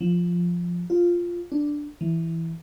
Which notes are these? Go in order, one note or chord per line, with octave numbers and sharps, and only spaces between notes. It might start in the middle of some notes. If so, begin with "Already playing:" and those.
F3
F4
D4
E3